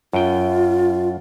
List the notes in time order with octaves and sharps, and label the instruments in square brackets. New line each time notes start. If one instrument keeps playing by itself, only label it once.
[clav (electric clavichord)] F#2 G5 [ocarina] F4